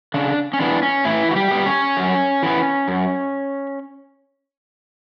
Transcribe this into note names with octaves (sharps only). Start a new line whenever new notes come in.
C#3 D4
C#4
E3 B3 D4
C#4
A2 E3 E4
F#4
G3 G4
G3 B3
C#4 C#5
F#2
E3 B3
F#2